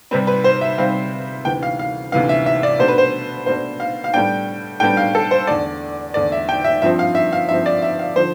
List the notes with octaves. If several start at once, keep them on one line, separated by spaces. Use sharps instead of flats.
C3 G3 C4 B4
B4
C5
E5
C3 G3 C4 F5
D2 C3 E3 B3 G5
F5
F5
D2 C3 E3 B3 F5
E5
E5
D5
B2 A3 D4 C5
B4
C5
B2 A3 D4 C5
F5
F5
A2 G3 B3 D4 G5
A2 G3 B3 D4 G5
F5
A4
C5
E2 D3 A3 D5
E2 D3 A3 D5
E5
G5
E5
G2 F3 C4 E5
F5
E5
F5
G2 F3 C4 E5
D5
E5
F5
D3 F3 C5